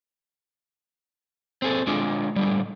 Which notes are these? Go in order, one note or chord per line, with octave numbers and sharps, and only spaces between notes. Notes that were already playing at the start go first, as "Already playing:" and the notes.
C4 G#4 A4
G#3 D4 F4
A2 D3 G3